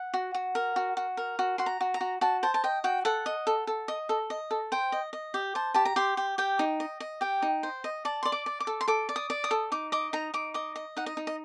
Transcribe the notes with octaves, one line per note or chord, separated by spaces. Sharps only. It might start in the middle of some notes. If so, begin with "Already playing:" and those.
Already playing: F#5
F#4
F#4
A#4
F#4
F#4
A#4
F#4
F#4 C6
A#5
F#4
A#5
F#4
F#4 A5
C5 A5
A5
D#5 G5
F#4 G5
A4 F#5
D#5
A4
A4
D#5
A4
D#5
A4
C5 G5
D#5
D#5
G4
C5 A5
G4 A5
A#5
G4 C6
G4
G4 G5
D#4
D#5
D#5
G4 G5
D#4
C5
D#5
D5 A5
D5 C6
D6
D5
D6
A4
C6
A4 D6
D5
D#6
D5
D#6
A4
D#4 D6
D#5 D6
D#4 A#5
D#4 D6
D#5 D6
D#5
D#4 F#5
D#5
D#4
D#5